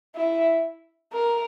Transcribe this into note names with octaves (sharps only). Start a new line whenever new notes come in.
E4
A#4